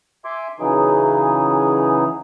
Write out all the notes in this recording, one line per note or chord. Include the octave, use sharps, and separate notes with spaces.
E5 G#5 C6 D6
C#3 E3 F#3 D#4 G#4